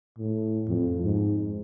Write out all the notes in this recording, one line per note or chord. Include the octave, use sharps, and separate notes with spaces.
A2
F2
G#2